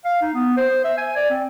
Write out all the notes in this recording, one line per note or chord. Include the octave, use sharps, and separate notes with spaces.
F5
D#4
B3
C5
E5
G#5
D5
C4